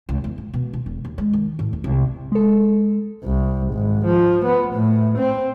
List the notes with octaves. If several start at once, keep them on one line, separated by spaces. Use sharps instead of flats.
C#2
E2
G#2
B2
F4
E1
D#2
G#3
D#3
A2
D#2
C2
G#3 A4
C2
G#1
F3
B3
A2
C4